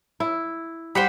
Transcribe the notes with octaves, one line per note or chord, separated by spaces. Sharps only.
E4
G3 C5 F#5 B5